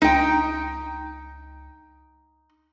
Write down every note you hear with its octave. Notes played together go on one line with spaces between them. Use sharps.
C#2 D#4 G5